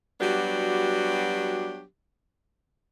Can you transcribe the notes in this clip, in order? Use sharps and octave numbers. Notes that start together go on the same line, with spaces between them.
F#3 G3 B3 D4 F#4 G4